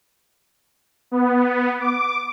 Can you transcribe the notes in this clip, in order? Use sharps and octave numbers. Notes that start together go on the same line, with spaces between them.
B3
D6